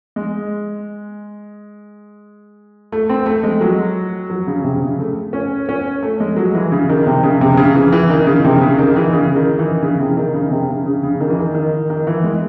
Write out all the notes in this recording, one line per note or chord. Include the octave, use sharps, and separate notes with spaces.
G#3
A3
C4
A3
G#3
F#3
F#3
C#3
C3
C#3
A3
C#4
C#4
A3
G#3
F#3
E3
C#3
D#3
C3
C#3
C3
C#3
E3
E3
D#3
C#3
C3
C#3
D#3
E3
C#3
D#3
E3
C#3
C3
D#3
C#3
C3
C#3
C#3
C#3
D#3
E3
D#3
D#3
D#3
E3
G#3